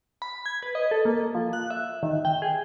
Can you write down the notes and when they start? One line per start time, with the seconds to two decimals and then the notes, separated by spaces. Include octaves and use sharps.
0.22 B5
0.46 G#6
0.63 B4
0.75 D#5
0.91 A4
1.05 A#3
1.35 F3
1.53 F#6
1.70 E5
2.03 D#3
2.25 G5
2.42 G#4